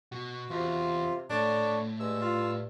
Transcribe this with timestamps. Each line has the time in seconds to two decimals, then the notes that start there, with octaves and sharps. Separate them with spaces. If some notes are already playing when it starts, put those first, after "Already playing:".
0.12 B2 F#4
0.50 E2 C3 F4
1.30 A2 D3 D4 C#5
2.00 G2 G#3 E6
2.21 F4